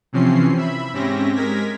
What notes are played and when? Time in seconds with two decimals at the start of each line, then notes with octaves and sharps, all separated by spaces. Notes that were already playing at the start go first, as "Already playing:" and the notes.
0.13 C3 E3 F3 C4 C#4 C7
0.58 E5 B5
0.93 G#2 C4 C#4 G4 E5 A#6
1.35 G#3 A#4 G#6 A#6 B6